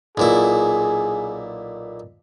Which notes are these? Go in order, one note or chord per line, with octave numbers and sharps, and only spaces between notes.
B1 A#2 E4 G#4